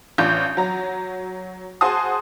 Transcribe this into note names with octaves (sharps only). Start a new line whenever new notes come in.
A1 D4 F4 G6
F#3 A#5
F#4 G#4 C5 A5 C6 D#6